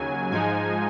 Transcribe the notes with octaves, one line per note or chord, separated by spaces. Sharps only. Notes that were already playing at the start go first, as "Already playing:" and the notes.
Already playing: D#2 C#3 F#3 G#5
G#2 F3 G#3 D#4 G#5